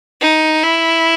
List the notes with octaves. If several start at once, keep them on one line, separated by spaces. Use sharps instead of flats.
D#4
E4